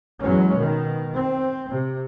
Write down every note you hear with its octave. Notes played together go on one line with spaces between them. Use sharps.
E2 F#3 G#3 C#4
B2 D#3
C4
C3